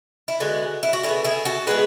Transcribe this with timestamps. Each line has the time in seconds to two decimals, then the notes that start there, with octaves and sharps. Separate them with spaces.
0.28 E4
0.40 D3 G#3 B3 F#4
0.83 E4
0.93 F#4
1.03 D3 G#3 E4 G#4
1.09 B3
1.24 E4 G#4
1.45 F#4 A4
1.67 D3 G#3 B3 G#4 B4